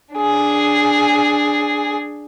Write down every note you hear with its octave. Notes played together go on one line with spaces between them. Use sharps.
D4 G#4